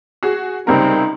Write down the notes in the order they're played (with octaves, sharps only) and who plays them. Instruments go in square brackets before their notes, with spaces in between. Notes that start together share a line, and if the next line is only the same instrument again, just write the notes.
[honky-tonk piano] F#4 G#4 F#5
[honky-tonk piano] C#2 C3 A#4 [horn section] G3 C4 [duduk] D#4